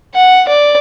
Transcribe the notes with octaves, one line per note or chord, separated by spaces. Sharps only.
F#5
D5